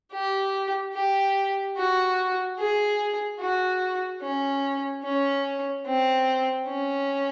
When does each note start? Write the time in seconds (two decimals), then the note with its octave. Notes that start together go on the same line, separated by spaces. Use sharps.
0.12 G4
0.94 G4
1.76 F#4
2.59 G#4
3.40 F#4
4.22 C#4
5.03 C#4
5.86 C4
6.68 C#4